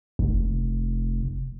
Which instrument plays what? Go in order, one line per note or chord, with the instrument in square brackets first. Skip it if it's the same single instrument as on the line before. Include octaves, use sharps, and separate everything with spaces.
[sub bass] F1